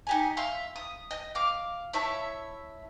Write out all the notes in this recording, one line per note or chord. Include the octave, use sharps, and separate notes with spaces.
D#4 G4 G#5
E5 F5 C6
D#6
D#5
F5 D6
E4 C#5 E5 A5